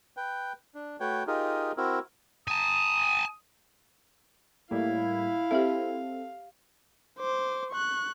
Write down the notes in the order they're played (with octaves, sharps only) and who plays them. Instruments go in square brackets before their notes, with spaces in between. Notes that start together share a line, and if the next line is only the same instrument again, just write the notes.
[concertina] B4 G5
D4
A3 F#4 B4 C#5 G5
D#4 F4 G4 G#4 A#4
C4 E4 F#4 A#4
[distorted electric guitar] G#5 A5 [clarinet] D#6
[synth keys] A2 G3 A#3 [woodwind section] E4 [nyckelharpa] F5
[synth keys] C4 A4 [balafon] G4 E5
[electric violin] C5 D6
C#6 F#6